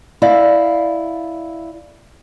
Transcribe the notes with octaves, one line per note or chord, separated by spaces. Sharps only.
E4 D5 F5